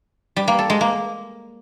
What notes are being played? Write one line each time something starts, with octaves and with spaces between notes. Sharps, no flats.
G3
A#3
A4
G#3
A#3